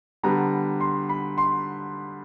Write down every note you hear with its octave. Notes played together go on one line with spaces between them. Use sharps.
D3 G3 B3 A#5
C6
B5
C6